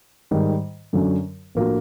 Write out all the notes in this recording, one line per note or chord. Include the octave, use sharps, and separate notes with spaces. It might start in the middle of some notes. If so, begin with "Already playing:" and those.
G#2 D#3 G3
F#2 D3 F#3
A2 F3 A#3 D4 F#4